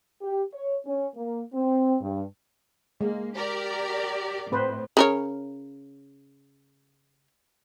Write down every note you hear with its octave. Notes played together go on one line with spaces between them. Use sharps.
G4
C#5
C#4
A#3
C4
G2
G#3 A#3
G4 A#4 D5
A2 C4 B4 C5
C#3 A#4 C#5